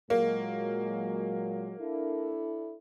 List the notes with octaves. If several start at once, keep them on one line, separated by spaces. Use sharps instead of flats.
A#2 F#3 G#3 A#3
D4 E4 A4